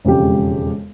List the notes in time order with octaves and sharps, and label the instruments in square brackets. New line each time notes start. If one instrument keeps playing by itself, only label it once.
[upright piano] E1 F2 C#3 G#3 G4